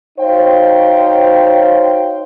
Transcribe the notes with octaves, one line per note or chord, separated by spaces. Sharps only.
D#4 F#4 C5 C#5 F5 G5